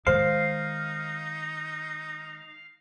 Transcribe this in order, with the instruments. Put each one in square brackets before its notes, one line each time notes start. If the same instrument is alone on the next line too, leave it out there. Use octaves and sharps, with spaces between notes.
[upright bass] D#3 G#3 [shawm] D#4 [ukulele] C5 [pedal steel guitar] F5